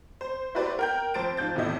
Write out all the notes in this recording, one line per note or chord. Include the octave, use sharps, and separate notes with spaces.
C5
E4 F#4 G4 B4 C5 D5
A#4 G5 G6
F2 C5 A6 D7
G#2 F3 G6 A6
E2 A2 C3 E4 D#5